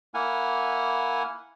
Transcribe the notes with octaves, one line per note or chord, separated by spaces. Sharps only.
A#3 E4 F#5 G#5 F6